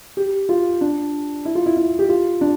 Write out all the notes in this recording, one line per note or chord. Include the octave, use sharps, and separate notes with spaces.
G4
F4
D4
E4
F4
E4
E4
G4
F4
D4